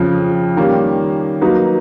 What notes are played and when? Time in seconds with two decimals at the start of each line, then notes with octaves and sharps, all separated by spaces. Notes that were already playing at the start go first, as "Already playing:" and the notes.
Already playing: F2 C#3 F3
0.57 D#3 G3 A#3 C#4
1.41 F#3 A#3 D#4 F#4 B4